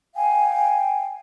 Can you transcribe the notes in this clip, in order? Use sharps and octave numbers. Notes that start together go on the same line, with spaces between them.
F5 G5 G#5